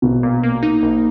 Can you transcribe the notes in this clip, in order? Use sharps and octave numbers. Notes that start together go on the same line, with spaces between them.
A#1 B2
A#2
A#3
D#4
A#1